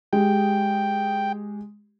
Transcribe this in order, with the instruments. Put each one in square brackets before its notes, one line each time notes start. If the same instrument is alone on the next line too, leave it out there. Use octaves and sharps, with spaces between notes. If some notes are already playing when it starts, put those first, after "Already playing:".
[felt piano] G#3 G4 [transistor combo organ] G5